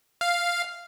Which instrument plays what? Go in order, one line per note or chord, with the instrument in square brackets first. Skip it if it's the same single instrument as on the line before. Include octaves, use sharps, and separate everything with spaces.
[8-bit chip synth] F5